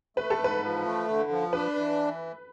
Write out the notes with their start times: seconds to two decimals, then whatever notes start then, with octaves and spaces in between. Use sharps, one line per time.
0.17 A3 B4
0.30 A4
0.39 G#2 B4
0.62 F3
0.85 A3
1.08 D3
1.31 F3
1.53 D4 B4
1.76 E3